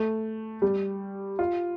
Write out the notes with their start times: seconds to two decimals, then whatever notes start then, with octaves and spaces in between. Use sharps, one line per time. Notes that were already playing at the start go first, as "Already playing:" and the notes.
Already playing: A3
0.62 G3
1.39 F4